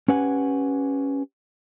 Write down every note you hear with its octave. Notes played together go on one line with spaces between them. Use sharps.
C#4 G4 B4 F#5 G#5